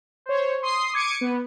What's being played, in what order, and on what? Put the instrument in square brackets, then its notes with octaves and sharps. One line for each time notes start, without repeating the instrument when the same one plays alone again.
[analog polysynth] C5 C#5
C6 D#6 C7
D6 G#6 C#7 D#7
B3